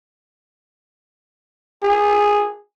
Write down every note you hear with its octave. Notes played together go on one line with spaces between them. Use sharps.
G#4